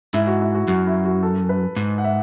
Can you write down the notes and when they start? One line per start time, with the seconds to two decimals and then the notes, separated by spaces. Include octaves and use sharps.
0.13 G#2 E4
0.27 F#4
0.41 E4
0.55 F#4
0.68 F#2 F#4
0.87 E4
1.05 F#4
1.22 A4
1.49 B4
1.76 G#2
1.98 F#5
2.04 E5